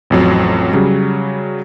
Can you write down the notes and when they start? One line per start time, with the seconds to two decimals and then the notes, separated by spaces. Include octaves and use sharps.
0.10 A1 F2 F#3
0.73 C#3 F#3 G3